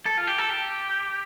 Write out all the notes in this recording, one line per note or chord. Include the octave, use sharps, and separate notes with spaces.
A4
F4
G4
A4
G4